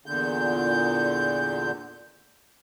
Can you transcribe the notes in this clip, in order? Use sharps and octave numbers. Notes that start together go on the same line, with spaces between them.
E2 A#2 D3 G6